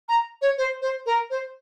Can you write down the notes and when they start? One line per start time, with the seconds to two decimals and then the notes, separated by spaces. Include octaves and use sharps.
0.09 A#5
0.42 C#5
0.58 C5
0.81 C5
1.06 A#4
1.30 C5